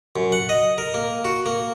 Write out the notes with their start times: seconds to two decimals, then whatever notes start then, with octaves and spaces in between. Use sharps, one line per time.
0.16 F#2
0.32 F#5
0.49 D#5
0.78 A#4
0.94 A#3
1.25 F#4
1.46 A#3